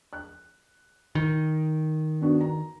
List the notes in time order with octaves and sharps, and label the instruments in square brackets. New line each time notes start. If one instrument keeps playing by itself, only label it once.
[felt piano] F#6
[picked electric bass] D#3
[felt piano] B3 D4 F#4
A#5